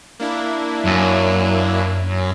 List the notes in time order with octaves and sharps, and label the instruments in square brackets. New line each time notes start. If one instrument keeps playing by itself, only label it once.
[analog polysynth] A#3 D4 E4
[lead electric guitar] F#2